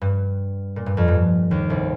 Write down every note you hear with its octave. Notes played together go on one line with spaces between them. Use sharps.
G2
A#2
G2
F2
G2
D#2 D#3
C2 C3